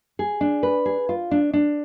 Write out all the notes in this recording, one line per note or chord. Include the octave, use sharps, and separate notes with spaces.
G#4
D4
B4
G#4
F4
D4
D4